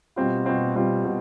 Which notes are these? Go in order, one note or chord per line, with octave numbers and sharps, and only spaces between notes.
B2 G3 C4 F4
B2 G3 C4 F4
B2 G3 C4 F4
B2 G3